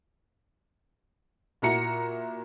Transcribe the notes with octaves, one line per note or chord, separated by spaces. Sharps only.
A#2 E4 F#4 A#5 C#7